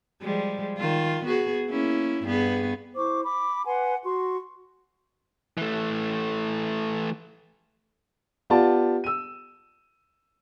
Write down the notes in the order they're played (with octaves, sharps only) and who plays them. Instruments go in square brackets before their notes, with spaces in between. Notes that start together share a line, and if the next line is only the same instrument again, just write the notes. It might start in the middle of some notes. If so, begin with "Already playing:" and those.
[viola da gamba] F3 G3 G#3
D#3 F4
B3 F#4 G#4
A#3 C#4 E4
G2 B3 G#4
[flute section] E4 C5 C#6 D6
B5 D6
B4 F#5 G#5 C6
F#4 C6 C#6
[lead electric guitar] E3 A3
[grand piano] B3 F4 G4 D5 A5
E6 D#7